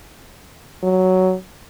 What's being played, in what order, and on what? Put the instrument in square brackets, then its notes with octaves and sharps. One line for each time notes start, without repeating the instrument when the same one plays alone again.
[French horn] F#3